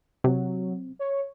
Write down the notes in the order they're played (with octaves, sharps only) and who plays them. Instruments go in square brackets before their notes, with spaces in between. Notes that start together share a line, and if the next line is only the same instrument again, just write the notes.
[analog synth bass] C3 [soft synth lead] F#3
[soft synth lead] C#5